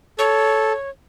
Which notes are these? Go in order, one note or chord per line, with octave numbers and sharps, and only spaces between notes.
A4 C#5